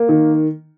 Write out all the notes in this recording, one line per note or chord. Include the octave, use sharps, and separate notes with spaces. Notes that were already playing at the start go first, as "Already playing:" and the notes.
Already playing: A#3
D#3